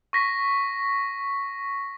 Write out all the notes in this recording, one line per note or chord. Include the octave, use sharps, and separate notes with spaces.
C#6 A#6 B6